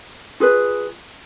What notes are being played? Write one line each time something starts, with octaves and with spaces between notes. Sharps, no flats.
F4 G#4 B4